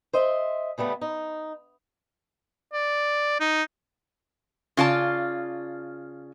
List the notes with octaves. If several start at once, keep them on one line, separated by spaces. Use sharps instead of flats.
C5 D#5 E5
C#3 G3 A3 B3
D#4
D5
D#4
C#3 F4 D5 A5